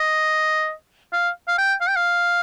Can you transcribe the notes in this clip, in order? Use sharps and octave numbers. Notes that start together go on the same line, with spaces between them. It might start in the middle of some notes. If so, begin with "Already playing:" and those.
Already playing: D#5
F5
F5
G5
F5
G5
F5